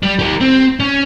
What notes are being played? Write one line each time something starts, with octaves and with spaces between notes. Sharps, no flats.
G3
G4 A#4
C4
C#4